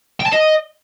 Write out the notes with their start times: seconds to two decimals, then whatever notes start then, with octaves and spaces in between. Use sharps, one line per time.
0.20 G5
0.27 A5
0.33 D#5